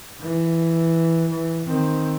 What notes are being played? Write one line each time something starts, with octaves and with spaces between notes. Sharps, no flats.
E3
E3
D#3 C4